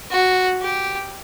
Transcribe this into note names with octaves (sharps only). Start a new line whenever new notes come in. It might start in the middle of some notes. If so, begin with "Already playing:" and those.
F#4
G4